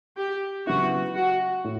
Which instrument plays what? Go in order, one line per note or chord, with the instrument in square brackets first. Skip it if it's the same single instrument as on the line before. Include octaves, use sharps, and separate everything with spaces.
[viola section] G4
[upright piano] C#3 F#3 B3 E4 [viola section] F#4
[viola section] F#4
[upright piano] A2